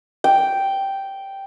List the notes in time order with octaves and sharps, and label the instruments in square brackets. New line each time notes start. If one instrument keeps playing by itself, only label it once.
[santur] G5